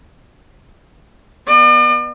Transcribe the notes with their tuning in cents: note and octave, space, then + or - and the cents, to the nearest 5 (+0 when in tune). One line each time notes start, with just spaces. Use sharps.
B3 -15 D5 +45